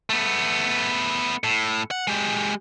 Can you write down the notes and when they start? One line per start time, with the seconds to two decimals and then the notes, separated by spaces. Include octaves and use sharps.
0.10 A3 B3
1.44 A2
1.91 F#5
2.07 G#3 G4